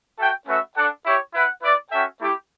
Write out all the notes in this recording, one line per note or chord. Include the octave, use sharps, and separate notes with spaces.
F#4 A4 E5 G5
A3 C#4 F#4 B4 E5
D4 A4 D5 F#5
E4 G4 C#5
E4 B4 F#5
E4 B4 D5
C#4 F#4 A4 E5 G5
A3 E4 G4